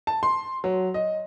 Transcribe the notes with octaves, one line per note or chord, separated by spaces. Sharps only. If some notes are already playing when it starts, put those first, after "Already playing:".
A5
C6
F#3
D#5